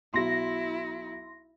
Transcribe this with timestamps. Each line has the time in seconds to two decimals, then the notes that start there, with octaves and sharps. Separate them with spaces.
0.14 B1 F#3 E4 C6 A#6